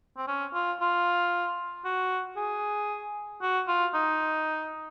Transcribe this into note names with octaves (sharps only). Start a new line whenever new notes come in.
C4
C#4
F4
F4
F#4
G#4
F#4
F4
D#4